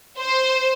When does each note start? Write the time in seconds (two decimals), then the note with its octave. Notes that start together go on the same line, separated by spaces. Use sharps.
0.19 C5